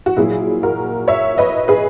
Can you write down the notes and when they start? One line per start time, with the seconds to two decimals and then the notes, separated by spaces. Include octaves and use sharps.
0.06 F#4
0.17 A#2 F#3 A#3 E4 G#4
0.63 F#4 A#4
1.08 C#5 E5
1.38 B4 D#5
1.68 G#4 B4